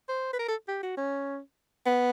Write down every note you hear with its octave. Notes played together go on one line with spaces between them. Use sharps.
C5
B4
A#4
A4
G4
F#4
C#4
B3